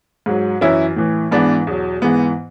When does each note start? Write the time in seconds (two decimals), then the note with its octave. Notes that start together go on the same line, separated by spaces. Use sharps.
0.26 G#2 F#3
0.61 F#2 E3 C#4 E4
0.96 A2 E3
1.31 G#2 E3 B3 D4
1.67 E2 B2 F#3
2.02 G#2 E3 B3